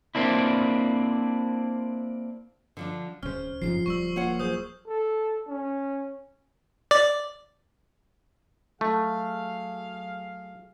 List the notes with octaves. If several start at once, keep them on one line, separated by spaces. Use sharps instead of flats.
A#3 C4 D4 E4
D3 F3 D4
D1 C#3 C#4 C5 F6
F#1 G#2 C#3 F3 C7
D1 G3 C#6 E6
A#3 F4 C#5 F#5
F#3 G#4 C5 D#6 G6
A4
C#4
D5
F#3 A3 G#4 F5